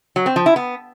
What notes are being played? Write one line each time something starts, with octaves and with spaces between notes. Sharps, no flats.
F#3
C4
F3
E4
B3